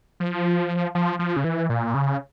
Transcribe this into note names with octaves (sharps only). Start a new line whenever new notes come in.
F3
F3
F3
C#3
E3
A#2
C#3